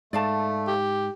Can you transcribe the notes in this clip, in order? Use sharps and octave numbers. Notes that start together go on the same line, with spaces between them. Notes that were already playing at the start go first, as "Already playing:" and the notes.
G#2 A3 D5 F5 A5
G4